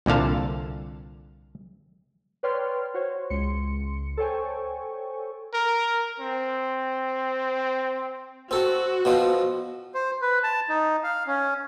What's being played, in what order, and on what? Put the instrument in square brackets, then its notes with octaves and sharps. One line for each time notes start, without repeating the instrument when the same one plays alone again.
[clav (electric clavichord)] C2 A#2 D3 F5 A5
[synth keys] B4 C#5 D5 G5 C6 F6
F#4 C5 C#5
C#2 C6 C#7
A4 C5 C#5 G5 G#5 C#6
[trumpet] A#4
C4
[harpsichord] C4 A4 [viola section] F#4
[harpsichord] B2 F3 C4
[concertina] C5
B4
A5
D#4
F5
C#4